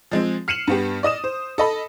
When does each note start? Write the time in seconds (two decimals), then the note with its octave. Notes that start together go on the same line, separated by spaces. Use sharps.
0.11 F3 G#3 C4
0.48 F6 C7 C#7 D#7 E7 F#7
0.67 G2 B3 G4
1.03 D5 D#5 D#6 E7
1.24 C5
1.58 A4 D#5 B5